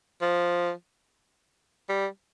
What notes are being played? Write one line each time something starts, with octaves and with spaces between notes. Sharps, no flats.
F3
G3